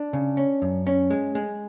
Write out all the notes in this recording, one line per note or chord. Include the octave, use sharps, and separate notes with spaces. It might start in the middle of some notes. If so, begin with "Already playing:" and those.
Already playing: D4
C#3
C#4
F#2
C#4
G#3
G#3